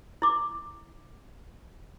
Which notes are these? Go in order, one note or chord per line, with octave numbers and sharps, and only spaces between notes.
E4 D6